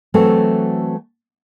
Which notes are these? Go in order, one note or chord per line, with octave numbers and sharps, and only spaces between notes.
E3 F#3 A3 C4 F#4 A4